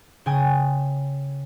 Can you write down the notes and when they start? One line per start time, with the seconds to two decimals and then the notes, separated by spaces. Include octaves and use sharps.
0.26 C#3 G5 G#5 D#6